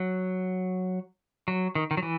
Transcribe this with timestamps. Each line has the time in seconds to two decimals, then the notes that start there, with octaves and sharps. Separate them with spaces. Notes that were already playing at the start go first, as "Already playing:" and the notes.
Already playing: F#3
1.48 F#3
1.75 D#3
1.91 D#3
1.97 F#3
2.03 E3